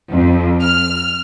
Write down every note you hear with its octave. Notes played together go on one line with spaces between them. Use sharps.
F2
F6